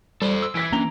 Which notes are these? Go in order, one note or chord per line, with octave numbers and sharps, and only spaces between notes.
G3 A4 C5
E6
E3 G#6 B6 D7
A#3 C#4 D4 A#5 F7 G7